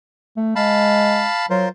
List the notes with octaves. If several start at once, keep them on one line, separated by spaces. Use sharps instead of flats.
A3
G#3 F5 A5 B5
F#3 F4 A#4 C5